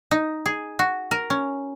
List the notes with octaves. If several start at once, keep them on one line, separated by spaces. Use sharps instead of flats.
D#4
G#4
F#4
A#4
C#4